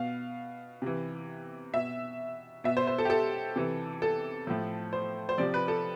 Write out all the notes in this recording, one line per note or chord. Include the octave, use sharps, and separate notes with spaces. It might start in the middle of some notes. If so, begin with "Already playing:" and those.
Already playing: B2 F5
C3 E3
B2 E5
B2 E5
C5
C5
A4
G4
A4
C3 E3
A4
A2 F3
C5
C5
C3 F3 D5
B4
A4